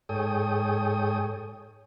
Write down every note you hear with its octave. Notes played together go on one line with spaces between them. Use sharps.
G#2 G#4 A4 C#5 G5 D#6